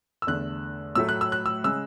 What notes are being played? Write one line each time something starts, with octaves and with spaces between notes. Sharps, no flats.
E6
E2 D3 A3 F#6
A2 F#3 A3 E6
F#6
E6
F#6
E6
C#3 G#3 E6